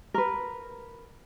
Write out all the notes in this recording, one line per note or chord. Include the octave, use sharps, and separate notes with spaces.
A#4 B4